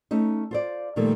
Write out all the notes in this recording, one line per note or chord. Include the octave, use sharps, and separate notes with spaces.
A3 C#4 D#4
F4 C5 D5
A#2 D#3 F3 G3 A3 A#3